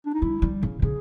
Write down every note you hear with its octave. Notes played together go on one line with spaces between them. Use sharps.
D4
D#4
G3 E4
G3
C#3
C#3 G#4